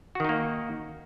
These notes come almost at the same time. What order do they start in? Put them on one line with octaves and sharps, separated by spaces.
F#4 D#3 D#4 A#3